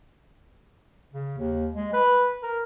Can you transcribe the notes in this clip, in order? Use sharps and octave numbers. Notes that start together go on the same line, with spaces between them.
C#3
D#2
G#3
B4
A#4